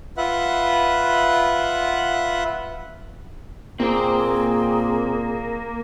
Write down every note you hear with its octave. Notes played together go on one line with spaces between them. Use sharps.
F4 B4 E5 F#5 F#6
A#2 A#3 C4 G#4 C5